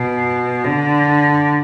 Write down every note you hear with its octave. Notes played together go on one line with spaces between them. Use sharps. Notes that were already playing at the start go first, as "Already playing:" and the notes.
Already playing: B2
D3